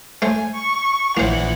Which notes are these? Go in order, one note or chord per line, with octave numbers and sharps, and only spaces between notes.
A3 C5 G#5
C#6
A#1 E3 A#3 C5 F#5